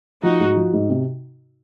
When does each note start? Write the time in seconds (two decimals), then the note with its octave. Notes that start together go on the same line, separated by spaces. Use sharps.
0.23 F3 D#4 F#4
0.40 G#2
0.56 F3
0.73 G#2
0.89 C3